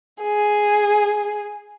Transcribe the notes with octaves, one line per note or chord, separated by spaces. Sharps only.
G#4